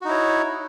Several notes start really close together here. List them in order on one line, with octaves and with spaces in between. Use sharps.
F#4 D#4 E4 C#5